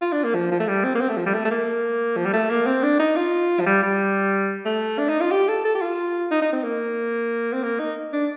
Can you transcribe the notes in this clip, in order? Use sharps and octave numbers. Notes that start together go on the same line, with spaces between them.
F4
D4
A#3
F3
F3
A3
G3
C4
A#3
C4
A3
F3
G3
A3
A3
A#3
F3
G3
A3
A#3
C4
D4
D#4
F4
F3
G3
G3
A3
D4
D#4
F4
G4
A4
A4
G4
F4
D#4
D#4
C4
A#3
C4
A#3
D#4
D4